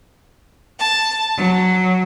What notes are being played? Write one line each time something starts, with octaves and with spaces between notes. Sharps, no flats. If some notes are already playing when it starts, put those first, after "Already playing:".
A5
F#3